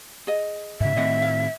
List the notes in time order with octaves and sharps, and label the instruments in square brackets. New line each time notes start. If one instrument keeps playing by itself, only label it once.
[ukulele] G#4 D#5
[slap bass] G#2 C#3 [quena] E5
[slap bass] A2 D#3 C4 [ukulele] D#5 F#5
[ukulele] F5